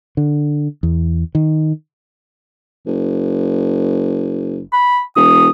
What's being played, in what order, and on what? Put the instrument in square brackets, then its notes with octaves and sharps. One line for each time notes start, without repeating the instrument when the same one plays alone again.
[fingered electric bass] D3
E2
D#3
[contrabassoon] F#1
[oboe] B5
[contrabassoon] E1 [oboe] D#6